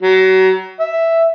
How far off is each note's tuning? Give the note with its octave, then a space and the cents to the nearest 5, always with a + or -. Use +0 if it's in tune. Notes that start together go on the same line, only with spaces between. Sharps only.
F#3 +30
E5 +0